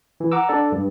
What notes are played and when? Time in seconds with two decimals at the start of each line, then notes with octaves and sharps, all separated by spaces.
0.20 E3
0.32 F#5 A#5 D6 E6
0.49 D4 A4 D5
0.72 G2